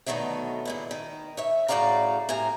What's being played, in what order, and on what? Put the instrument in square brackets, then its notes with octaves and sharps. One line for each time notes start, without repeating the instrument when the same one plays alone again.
[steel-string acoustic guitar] B2 D3 D#3 F#3 A3
A#2 G#3 E4
D#3
C#5 E5
A2 C#3 F#4 D5 F5 A#5
A2 C3 G#5 A#5